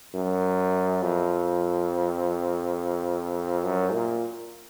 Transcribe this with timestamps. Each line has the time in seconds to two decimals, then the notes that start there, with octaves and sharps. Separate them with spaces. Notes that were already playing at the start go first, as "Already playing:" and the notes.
0.14 F#2
1.02 F2
3.64 F#2
3.93 A#2